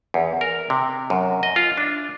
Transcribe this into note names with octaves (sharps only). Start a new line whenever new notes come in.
E2
A#4
C3
F#2
D#5
F4
D4